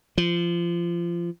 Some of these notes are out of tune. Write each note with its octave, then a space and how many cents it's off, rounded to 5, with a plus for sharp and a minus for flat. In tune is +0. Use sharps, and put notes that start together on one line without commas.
F3 -25